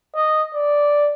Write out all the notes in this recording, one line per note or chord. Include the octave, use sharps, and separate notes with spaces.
D#5
D5